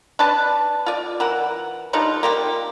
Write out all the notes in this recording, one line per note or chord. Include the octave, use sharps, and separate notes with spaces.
D4 B4 A5
F4 D5
E3 A#4 F#5
G3 D4 D#4 F4
A#3 F4 G4